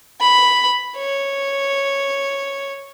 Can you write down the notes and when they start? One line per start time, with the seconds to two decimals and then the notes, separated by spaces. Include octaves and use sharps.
0.21 B5
0.97 C#5